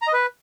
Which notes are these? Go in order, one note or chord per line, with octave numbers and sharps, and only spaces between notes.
A#5
D#5
B4